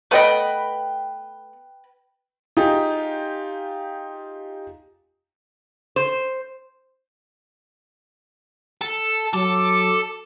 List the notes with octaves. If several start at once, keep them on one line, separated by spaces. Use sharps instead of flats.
A3 B3 B4 D#5 G5 B5
D#4 F4 G4 G#4
C5
A4
F#3 A4 D6